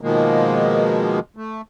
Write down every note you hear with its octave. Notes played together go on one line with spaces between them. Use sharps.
B2 D#3 F3 G#3 A#3
A3